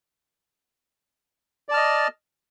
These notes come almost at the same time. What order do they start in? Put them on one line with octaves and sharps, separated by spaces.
D5 A5 F6 D#5